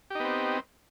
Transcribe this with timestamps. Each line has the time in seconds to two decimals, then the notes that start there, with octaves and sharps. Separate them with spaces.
0.10 G4
0.15 D#4
0.20 B3
0.25 C4